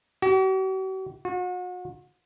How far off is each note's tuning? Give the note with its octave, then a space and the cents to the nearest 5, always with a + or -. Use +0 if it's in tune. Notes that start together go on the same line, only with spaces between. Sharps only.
F#4 +45
F#4 -40